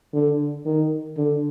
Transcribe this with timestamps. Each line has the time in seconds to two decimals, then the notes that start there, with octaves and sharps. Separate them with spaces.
0.13 D3
0.65 D#3
1.17 D3